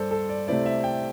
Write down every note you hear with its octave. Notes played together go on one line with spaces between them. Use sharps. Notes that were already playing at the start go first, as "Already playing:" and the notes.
Already playing: G2 A4 C5 D5
A4
D5
C3 A3 C4 E4 D5
E5
G5